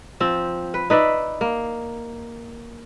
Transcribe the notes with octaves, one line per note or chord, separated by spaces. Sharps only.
F3 C4
B4
D#4 B4 D5 E5
A#3